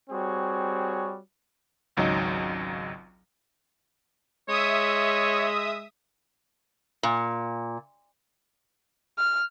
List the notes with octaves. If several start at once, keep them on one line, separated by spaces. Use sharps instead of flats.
G3 C4 F#4 G#4 C#5
G#1 C#2 F#3 D#4 D#5
G#3 C#5 E5 D#6
A#2
F6